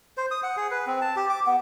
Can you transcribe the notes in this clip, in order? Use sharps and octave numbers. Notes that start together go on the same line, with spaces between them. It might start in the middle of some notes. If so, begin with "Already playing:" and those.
C5
D#6
F#5
G#4
B4
C4
A5
G4
D6
B3